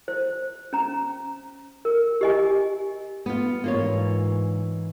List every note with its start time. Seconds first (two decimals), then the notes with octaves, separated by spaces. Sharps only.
0.08 C5
0.73 C#4 A#5
1.85 A#4
2.21 G4 D#5 G#5
3.26 B3 F4
3.64 G#2 E3 A#3 F4 C#5